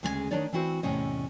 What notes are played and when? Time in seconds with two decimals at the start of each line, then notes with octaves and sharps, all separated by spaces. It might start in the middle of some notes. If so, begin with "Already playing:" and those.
0.03 D2 C#3 G#3 G#4 B4 G#5
0.31 D#3 E3 D4 D#4 C#5 D5
0.53 E3 C4 E4 F#4 C5
0.83 E2 A2 C3 C#4 D#5